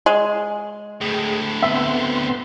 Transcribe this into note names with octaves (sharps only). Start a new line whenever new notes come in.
G#3
D2 A2 G#4 G5
B3 C4 E5 C6